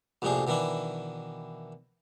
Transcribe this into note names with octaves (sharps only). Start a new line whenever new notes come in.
A#1 F2 A2 C3 D4 G#4
B2 D#3 E3 D4 E4